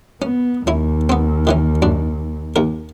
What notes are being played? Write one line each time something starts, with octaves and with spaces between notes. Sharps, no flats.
B3 C#4
D#2 C#4 E4
B3 C4
D#3 E3 C#4
F#2 D4
D#2 A#4